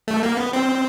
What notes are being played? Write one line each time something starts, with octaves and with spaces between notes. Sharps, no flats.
A3
A#3
B3
C4